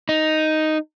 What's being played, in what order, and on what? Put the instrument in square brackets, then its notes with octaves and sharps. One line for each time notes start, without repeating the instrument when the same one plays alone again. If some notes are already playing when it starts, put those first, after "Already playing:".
[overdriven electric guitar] D#4